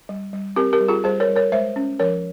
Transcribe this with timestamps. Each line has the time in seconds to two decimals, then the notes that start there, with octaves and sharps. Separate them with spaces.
0.09 G3
0.33 G3
0.56 C4 G4 A#4
0.73 G4 A#4
0.80 G3
0.88 F4 G#4
1.04 G3 G#4 C5
1.20 A#4 C#5
1.29 G3
1.36 A#4 C#5
1.52 G#3 C5 E5
1.76 C#4
1.99 F3 A#4 C#5